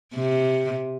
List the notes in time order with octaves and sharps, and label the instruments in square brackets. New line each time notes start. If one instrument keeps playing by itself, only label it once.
[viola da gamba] C3